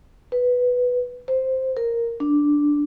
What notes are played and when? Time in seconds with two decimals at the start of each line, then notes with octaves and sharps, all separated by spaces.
0.32 B4
1.28 C5
1.77 A#4
2.20 D4